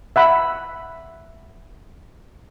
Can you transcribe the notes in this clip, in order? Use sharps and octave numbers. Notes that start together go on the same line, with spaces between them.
E5 F#5 B5